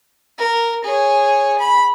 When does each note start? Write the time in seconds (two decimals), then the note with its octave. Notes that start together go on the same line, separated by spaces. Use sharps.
0.38 A#4
0.85 G#4 C#5
1.59 B5